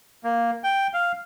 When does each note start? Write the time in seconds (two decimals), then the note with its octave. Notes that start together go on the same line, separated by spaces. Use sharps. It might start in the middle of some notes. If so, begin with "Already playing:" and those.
0.24 A#3
0.64 G5
0.94 F5